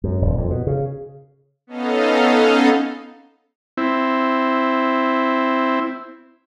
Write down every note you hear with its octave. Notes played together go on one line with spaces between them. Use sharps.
F#2
D#1
F2
B2
C#3
B3 C#4 D#4 A4 D#5 F5
C4 E4